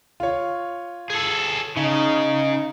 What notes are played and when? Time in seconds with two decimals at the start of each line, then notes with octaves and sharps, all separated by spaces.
0.20 F4 C#5
1.10 G#4 A4
1.77 C#3 D#4